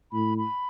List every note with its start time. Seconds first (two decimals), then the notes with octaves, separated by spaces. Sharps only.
0.12 A2 B5
0.38 B5